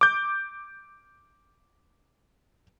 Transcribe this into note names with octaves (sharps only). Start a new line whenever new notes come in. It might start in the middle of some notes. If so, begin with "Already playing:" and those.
D6 G6